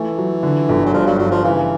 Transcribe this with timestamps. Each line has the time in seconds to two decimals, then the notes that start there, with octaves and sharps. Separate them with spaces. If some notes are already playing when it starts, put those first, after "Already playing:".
Already playing: E3 A3
0.18 F#3
0.43 D3
0.69 G1
0.86 F#3
0.94 G2 F3
1.07 F#3
1.19 G2 F#3
1.31 F3
1.44 C#3 E3